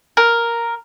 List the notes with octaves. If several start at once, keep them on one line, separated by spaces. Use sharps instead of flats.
A#4